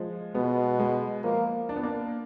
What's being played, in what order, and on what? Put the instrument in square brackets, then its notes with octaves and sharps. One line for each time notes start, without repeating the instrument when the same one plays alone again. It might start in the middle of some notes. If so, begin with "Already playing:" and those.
Already playing: [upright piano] F3 G#3
[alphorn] B2 [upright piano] G#3 B3
[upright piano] G#3 B3
[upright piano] F3 [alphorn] A#3
[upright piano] D4
B3
A#3 D4